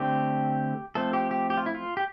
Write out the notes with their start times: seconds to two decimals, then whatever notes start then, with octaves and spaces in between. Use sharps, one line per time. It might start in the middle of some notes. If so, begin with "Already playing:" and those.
Already playing: D3 A3 C4 G4
0.95 F3 A3 C4 A4
1.13 G4
1.31 G4
1.50 G4
1.57 F4
1.66 E4
1.75 F4
1.97 G4